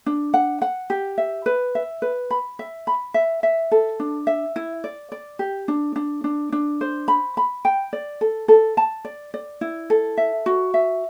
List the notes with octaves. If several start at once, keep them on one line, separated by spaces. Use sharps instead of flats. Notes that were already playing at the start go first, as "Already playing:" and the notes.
D4
F#5
F#5
G4
E5
B4
E5
B4
B5
E5
B5
E5
E5
A4
D4
E5
E4
D5
D5
G4
D4
D4
D4
D4
C5
B5
B5
G5
D5
A4
A4
A5
D5
D5
E4
A4
E5
F#4
E5